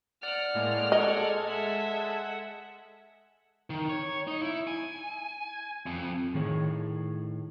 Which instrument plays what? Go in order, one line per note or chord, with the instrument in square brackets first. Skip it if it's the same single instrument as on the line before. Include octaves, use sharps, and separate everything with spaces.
[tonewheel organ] D5 F#5 [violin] F6
[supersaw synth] A2 G#3 A#3
[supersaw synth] G#3 A4 G#6 [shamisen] D#5
[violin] E5 [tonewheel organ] F#5
[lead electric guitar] D#3
C#5
D#4
E4
G#5
F2
[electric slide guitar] A2 D#3 G#4 C#5